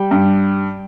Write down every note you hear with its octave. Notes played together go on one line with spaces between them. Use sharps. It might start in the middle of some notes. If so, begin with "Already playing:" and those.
Already playing: G3 G5
G2